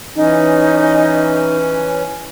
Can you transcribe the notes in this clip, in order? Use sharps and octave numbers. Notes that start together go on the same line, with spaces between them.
E3 C#4 D#4